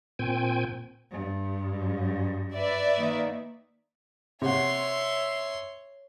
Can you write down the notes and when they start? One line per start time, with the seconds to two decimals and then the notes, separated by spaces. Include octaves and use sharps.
0.19 A#2 C4 G5 G#5
1.11 G2
2.55 B4 D5 E5
2.98 D#3 A#3
4.42 C3 C#5 E5 F#5 C6